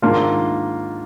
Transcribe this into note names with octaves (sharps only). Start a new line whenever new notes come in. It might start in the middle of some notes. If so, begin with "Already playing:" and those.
G#2 D#3 A#3 D4 F4